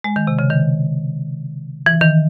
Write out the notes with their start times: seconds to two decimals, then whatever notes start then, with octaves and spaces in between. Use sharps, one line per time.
0.04 G#3
0.16 D#3
0.27 C3
0.39 C#3
0.50 D#3
1.86 E3
2.01 D#3